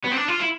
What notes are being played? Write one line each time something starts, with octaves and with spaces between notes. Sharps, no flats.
B3
C4
D4
F4
E4